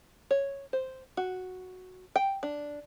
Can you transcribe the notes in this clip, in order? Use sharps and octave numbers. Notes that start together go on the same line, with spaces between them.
C#5
C5
F#4
G5
D4